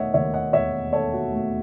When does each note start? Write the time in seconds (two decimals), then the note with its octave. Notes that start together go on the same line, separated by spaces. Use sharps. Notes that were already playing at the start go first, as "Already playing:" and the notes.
Already playing: E1 D#3 A3 C#5 D#5 E5 F#5
0.14 D#2 C#5 E5
0.34 D#5 F#5
0.53 E1 C#5 E5
0.93 D#3 A4 C#5
1.13 F#4
1.33 A3